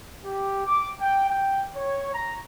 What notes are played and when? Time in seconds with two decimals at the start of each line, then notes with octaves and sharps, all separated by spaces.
0.25 G4
0.66 D6
1.00 G5
1.29 G5
1.76 C#5
2.13 A#5